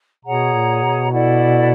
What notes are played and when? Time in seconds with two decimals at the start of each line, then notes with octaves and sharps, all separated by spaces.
0.25 B2 G#4 C#5 F#5 A#5
0.54 A#2
0.82 B2
1.11 E4 A4 D5 F#5